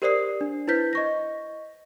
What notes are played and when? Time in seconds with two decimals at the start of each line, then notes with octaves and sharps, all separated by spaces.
0.02 G4 A#4 C5 D5 D#6 C7
0.41 D4
0.68 E4 B4 C5 G6 B6
0.93 D#5 C#6 A#6